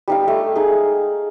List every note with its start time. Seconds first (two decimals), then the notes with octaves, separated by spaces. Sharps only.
0.08 G3 D#4 F5
0.28 A3
0.56 D#4 G#4